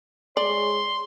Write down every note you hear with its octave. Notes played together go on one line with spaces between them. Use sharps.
G#3 G#4 C#5 D5 C6